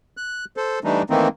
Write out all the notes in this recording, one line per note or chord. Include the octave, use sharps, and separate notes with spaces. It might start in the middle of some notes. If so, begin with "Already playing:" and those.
F#6
A4 C5
E3 G3 A3 D4 D#4
D#3 E3 A3 A#3 C4 D#4